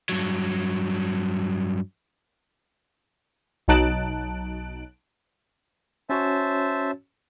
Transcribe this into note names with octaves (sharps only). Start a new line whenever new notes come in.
G2 F#3
B1 F#3 D#4 A5 F#6 D7
C#4 F#4 C5 C#5 E5 A5